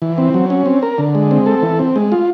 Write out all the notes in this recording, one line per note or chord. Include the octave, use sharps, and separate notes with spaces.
E3
C4
F#3
C#4
C4
A#4
D3
G#3
C4
A4
E3
C4
G#3
F4